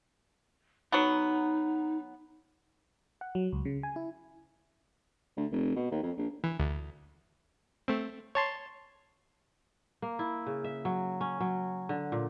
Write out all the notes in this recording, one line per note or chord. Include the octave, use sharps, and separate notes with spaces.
F#3 B3 D#4
F#5
F#3
C#2
C#3
G#5
E4
D2
F1
B2
D#2
F2
A#1
E3
D2
A3 C4
C#5 A5 C6
A#3
E4
C#3
E5
F#3
C#4
F#3
D3
A#2